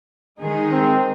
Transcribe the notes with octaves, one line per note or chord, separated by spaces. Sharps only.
D#3 G#3 D#4 G#4
C4